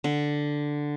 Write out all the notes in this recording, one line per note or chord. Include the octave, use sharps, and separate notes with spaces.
D3